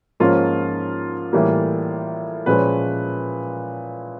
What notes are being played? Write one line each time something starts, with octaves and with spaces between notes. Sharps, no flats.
G#2 F3 A#3 C#4 F4
A2 E3 G3 A#3
A#2 F3 G#3 C#4 B4